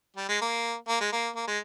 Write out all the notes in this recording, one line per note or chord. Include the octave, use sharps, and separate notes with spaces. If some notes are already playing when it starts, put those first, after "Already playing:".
G3
G#3
A#3
A#3
G#3
A#3
A#3
G#3